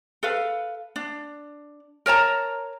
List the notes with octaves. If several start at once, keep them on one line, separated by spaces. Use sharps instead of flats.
A4 B4 F5
D4
A#4 C#5 A5 A#5